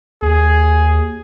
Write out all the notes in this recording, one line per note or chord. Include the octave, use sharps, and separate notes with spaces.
D#2 G#4